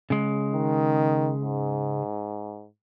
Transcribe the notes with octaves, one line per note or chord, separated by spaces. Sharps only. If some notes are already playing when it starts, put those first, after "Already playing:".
C#3 G#3
D#3
G#2